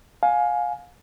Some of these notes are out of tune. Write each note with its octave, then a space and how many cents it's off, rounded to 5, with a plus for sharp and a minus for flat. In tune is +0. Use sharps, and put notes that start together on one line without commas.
F5 +25 G#5 +10